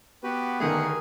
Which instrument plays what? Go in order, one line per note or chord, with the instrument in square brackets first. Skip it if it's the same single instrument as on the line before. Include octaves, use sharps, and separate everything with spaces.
[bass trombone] B3 [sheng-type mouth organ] F#4 G4 B4
[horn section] G2 G#4 A#4 [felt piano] D3 D#3 A3 [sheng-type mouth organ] F#5